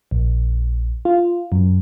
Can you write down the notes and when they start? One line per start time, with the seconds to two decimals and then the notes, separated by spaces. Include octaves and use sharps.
0.11 A#1
1.05 F4
1.52 F#2